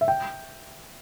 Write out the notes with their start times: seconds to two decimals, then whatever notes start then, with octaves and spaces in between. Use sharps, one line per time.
0.01 E5
0.08 G5